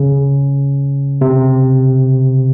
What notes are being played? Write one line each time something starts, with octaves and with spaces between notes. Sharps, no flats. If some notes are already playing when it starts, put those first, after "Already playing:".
Already playing: C#3
C3